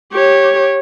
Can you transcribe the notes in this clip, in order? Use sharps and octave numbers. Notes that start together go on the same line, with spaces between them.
G4 C#5